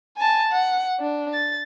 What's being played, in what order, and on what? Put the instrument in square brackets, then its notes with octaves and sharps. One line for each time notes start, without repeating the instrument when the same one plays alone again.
[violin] G#5 A5
F#5
D4
A6